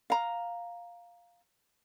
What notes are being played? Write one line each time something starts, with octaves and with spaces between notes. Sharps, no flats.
F5 A#5